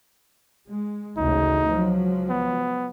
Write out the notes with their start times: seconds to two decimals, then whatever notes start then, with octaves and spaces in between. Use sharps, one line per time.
0.66 G#3
1.17 A1 D2 C#3 D#4
1.67 C#2 F3 F#3
2.30 B3